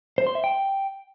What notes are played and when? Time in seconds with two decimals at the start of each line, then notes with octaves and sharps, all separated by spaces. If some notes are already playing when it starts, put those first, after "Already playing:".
0.18 C5
0.27 C6
0.35 E5
0.44 G5